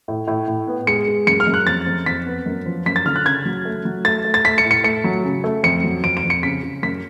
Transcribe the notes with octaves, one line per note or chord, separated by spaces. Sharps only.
A2
A2
A2
B3
G#3 C#7
G#3
F#2 C#7
F6
F#2
F#6
F2 A6
F2
F2 B6
B3
F#2
F3
F#2 B6
A6
D3 F6
F#6
C#3 G#6
F#3
A3
F#3
A3 A6
A3
A6
A3 B6
C#7
A2
C#7
A3 C#7
F#3
C#3
A3
F2 C#7
F#3
F2 D7
D7
F2
C#7
C#3 B6
C#3
F#2 B6